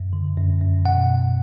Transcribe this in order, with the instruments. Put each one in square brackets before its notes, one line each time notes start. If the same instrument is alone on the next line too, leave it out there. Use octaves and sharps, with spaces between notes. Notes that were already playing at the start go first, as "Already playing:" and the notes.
Already playing: [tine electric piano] F#2
D3
F#2
F#2
B2 F#5